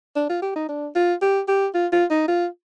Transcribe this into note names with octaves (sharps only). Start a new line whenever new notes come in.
D4
F4
G4
D#4
D4
F4
G4
G4
F4
F4
D#4
F4